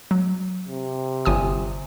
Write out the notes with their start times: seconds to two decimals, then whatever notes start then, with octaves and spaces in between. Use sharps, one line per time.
0.11 F#3
0.69 C3
1.25 G1 G#5 D#6